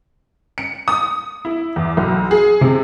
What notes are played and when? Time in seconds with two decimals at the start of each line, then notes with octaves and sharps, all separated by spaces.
0.58 C#7
0.88 D#6
1.45 E4
1.76 E2
1.97 B1
2.31 G#4
2.61 C3